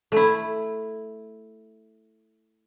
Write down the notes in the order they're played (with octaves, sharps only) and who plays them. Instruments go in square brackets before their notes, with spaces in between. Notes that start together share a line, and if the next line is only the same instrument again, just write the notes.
[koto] A3 E4